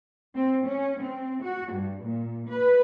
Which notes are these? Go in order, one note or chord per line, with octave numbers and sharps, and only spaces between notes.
C4
C#4
C4
F#4
G2
A#2
B4